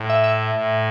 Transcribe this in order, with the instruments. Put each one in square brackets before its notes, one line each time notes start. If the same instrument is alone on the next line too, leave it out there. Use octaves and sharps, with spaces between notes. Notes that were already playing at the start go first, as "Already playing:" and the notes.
Already playing: [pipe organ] A2
[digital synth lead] E5
E5
[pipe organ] A2